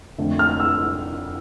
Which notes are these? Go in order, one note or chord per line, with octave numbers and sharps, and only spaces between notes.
F2 D3 A3
F6
E6